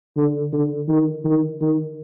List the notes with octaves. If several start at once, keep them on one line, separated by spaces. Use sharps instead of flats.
D3
D3
D#3
D#3
D#3